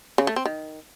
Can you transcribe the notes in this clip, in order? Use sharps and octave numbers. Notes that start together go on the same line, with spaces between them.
C#3
A3
C4
D#3